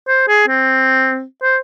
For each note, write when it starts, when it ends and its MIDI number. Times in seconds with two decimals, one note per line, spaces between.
0.08 0.27 72
0.28 0.44 68
0.48 1.24 60
1.43 1.58 72